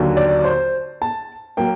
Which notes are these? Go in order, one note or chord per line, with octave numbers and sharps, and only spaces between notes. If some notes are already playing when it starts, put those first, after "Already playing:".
Already playing: D#2 D3 F#3
D5
C5
A5
F#3 A#3 G5